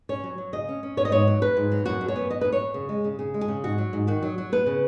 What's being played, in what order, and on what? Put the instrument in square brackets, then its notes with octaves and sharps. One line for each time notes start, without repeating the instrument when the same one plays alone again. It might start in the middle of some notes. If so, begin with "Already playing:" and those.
[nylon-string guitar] C#4 C#5
F#3
F#3
C#3 D#5
C#4
C#4
B3 C#5
D#5
G#2 C#5
F#3
F#3 B4
G#2
F#3
F#2 F#4
F#2
C#5
B3
B3 D#5
F#2 B4
C#5
F#2
C#3
G#3
C#3
C#3 G#4
G#3
G#4
C#3
G#2 F#4
F#3
G#2
D#3 F#4
F#3
F#3
B3 B4
C#3